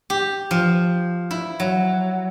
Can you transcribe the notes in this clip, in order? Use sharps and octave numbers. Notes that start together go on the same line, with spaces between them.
G4
F3
E4
F#3